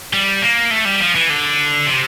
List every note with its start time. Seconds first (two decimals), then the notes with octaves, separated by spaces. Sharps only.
0.13 G3
0.42 A#3
0.71 A3
0.85 G3
1.00 F3
1.15 E3
1.30 D3
1.87 C3